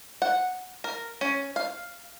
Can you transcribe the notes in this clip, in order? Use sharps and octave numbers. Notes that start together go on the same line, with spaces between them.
F#5
A#4
C#4
F5